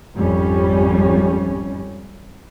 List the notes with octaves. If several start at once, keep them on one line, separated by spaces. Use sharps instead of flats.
G#1 F2 G3 C#4